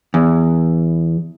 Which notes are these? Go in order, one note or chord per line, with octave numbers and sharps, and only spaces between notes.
E2